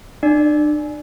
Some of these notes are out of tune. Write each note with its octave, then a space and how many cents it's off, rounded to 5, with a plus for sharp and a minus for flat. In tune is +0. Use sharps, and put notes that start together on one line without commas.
D4 +40 D5 +0